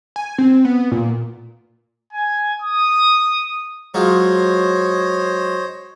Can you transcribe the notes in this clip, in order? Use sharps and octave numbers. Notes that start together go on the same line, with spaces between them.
G#5
C4
B3
A#2
G#5
D#6
F#3 G#3 F4 C5 C#5 D#5